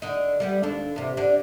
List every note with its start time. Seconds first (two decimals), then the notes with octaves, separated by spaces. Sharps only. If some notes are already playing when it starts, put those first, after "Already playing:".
0.02 D3 D#4
0.40 G3 A#3 B3
0.63 D#2 D4 A4
0.96 E2 C3
1.17 D3 D4